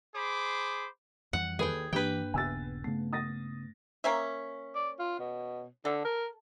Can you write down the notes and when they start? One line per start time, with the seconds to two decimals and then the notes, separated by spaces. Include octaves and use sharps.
0.15 G#4 C5 B5 D6
1.33 F2 E3 G3 F#5
1.59 D#2 G#4 A4 B4 G5
1.93 G2 E3 A#3 D4 G4 B4 G5
2.34 D#1 C#3 B3 G#5 E6 A6
2.84 C#3 A3 B3
3.13 D#6 A6 A#6
4.04 A#3 C#4 E5
4.75 D5
4.99 F4
5.19 B2
5.85 D3 A4
6.05 A#4